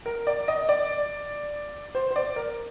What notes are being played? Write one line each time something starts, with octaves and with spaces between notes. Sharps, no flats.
A#4
D5
D#5
D5
C5
C5
D5
A#4